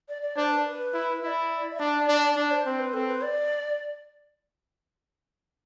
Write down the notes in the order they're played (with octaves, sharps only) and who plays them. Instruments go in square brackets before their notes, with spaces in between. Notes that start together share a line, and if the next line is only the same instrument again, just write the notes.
[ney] D5
D5
[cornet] D4 [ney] C5
[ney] B4
B4
[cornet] E4
[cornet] E4 [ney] E5
[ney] D5
E5
[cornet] D4 [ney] D5
[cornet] D4
[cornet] D4 [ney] D5
[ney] C5
[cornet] C4 [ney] C5
[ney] B4
[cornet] C4 [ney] A4
[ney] B4
D5